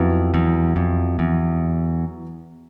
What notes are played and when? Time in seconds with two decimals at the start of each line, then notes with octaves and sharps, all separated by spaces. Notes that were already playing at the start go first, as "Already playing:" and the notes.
Already playing: F2 F#3 B3 E4
0.34 E2
0.76 F2
1.19 E2